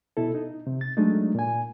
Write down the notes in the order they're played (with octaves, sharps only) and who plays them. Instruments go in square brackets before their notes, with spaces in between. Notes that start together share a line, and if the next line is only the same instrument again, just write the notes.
[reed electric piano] B2 E4 A4
D#4
C3
A6
F#3 G#3 A3 D4 D#4
A#2 G#5